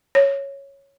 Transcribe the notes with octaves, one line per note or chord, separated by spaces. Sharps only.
C#5